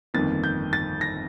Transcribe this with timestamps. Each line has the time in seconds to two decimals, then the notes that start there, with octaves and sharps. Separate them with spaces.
0.14 G1 F2 D#3 A#3 A6
0.44 G6
0.73 A6
1.01 A#6